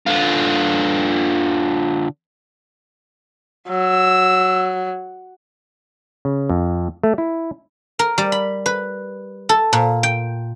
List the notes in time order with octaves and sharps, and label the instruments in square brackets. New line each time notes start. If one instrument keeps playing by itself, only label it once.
[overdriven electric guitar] D3 F4
[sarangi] F#3 [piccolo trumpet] E6
[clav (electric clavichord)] C#3
F2
A3
E4
[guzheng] A#4
G3
B5
B4
A4
A#2
G5